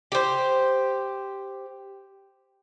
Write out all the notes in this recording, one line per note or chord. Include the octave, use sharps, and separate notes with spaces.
G4 C5